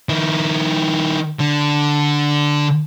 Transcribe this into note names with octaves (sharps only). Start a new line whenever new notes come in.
D#3 E4
D3